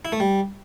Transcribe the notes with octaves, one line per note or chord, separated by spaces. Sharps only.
E4
A3
G3